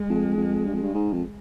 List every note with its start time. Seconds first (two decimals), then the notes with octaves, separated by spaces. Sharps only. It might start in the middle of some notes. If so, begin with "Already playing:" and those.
Already playing: G#3
0.09 F2
0.37 F2
0.67 G2
0.74 F2
0.83 G2
0.94 G#2
1.13 F2